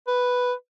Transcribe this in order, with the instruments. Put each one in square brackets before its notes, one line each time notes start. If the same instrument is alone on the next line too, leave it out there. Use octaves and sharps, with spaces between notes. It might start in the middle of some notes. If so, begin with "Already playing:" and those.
[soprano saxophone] B4